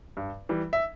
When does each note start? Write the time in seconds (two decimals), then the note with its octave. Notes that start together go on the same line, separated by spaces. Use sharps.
0.17 G2
0.49 E3 G3
0.73 E5